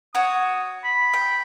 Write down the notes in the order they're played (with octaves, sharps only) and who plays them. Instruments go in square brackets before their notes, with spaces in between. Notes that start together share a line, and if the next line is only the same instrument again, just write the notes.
[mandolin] F#4 C#5 [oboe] D#6
[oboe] B5
[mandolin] G5